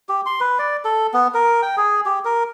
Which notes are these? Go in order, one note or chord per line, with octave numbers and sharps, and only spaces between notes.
G4
C6
B4
D5
A4
B3
A#4
G5
G#4
G4
A#4